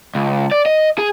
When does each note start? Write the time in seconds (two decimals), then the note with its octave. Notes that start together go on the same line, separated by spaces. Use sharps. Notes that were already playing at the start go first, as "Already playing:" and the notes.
0.15 C#2
0.52 D5
0.66 D#5
0.98 G#4